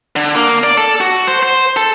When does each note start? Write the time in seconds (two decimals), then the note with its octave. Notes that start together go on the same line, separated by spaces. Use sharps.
0.16 D3
0.35 A#3
0.63 D5
0.77 A4
1.00 F#4
1.27 C5
1.43 C5
1.77 A4